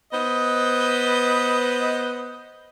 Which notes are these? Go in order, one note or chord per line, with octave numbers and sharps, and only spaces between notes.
B3 B4 C5 D#5